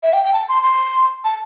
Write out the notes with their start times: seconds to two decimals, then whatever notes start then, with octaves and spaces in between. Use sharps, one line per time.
0.03 E5
0.13 G5
0.24 G5
0.33 A5
0.49 C6
0.63 C6
1.24 A5